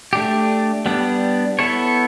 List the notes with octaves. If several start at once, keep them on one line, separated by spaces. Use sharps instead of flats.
A3 D4 G4
G3 B3 D4
B3 E4 A4 C#5